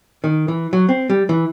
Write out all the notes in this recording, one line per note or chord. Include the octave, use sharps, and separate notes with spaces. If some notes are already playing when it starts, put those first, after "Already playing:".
D#3
E3
F#3
C4
G3
E3